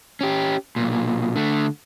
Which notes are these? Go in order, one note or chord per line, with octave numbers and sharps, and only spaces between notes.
C#4 G4
B1 A#2
D3 A3